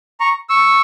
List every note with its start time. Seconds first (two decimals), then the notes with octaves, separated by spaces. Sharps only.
0.20 A#5 C#6
0.49 C#6 E6